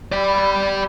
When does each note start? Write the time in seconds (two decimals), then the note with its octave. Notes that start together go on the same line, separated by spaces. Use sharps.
0.12 G3 E4 G4 D5
0.33 B3 E4